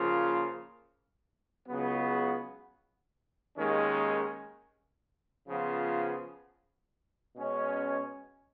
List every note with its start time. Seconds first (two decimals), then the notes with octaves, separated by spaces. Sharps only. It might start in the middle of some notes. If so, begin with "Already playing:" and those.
Already playing: C#3 F3 A#3 F4
1.67 C#2 C#3 F#3 B3
3.57 D#2 D#3 G#3 C#4
5.47 C#3 F3 B3 F4
7.35 B2 G#3 C#4